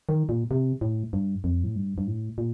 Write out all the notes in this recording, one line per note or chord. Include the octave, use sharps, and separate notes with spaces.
D#3
A#2
C3
A2
G2
F2
A2
G2
G2
A2
A#2